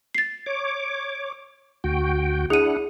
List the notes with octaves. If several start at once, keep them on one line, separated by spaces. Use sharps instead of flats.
A6 C7
C#5 D6
D2 F#4 G5
D4 E4 G#4 F#5 D#7